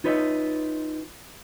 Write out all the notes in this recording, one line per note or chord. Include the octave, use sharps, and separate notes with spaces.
D#4 F4 B4 C#5 D#5 E5